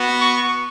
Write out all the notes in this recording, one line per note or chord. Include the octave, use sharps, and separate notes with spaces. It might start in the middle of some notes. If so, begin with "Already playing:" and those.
Already playing: B3 F#4
C#6